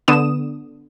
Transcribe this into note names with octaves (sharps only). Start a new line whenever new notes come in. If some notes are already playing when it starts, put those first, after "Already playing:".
D3 B3 D#6 E7